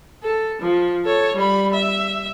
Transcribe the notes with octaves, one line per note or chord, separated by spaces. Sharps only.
A4
F3
A4 C#5
G3 B5
E5